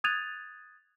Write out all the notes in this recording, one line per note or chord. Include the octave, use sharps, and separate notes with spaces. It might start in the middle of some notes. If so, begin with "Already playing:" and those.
D#6 F#6 G#6 A6 D#7 F7